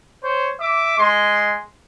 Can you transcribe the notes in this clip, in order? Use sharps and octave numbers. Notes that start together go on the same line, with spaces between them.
C5 C#5
E5 D6
G#3 C6